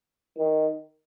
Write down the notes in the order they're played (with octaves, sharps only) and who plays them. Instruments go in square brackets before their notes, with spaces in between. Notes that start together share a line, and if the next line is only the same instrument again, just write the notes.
[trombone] D#3